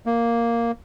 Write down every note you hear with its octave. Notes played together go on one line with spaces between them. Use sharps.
A#3